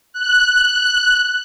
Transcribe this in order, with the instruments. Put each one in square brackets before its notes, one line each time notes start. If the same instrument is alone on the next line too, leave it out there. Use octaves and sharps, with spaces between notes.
[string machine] F#6